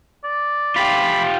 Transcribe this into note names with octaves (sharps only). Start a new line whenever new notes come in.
D5
F4 G4 B5